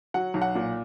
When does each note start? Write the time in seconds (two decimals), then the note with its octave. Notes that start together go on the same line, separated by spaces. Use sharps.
0.14 F#3 F#5
0.34 B1
0.41 F#5
0.55 A#2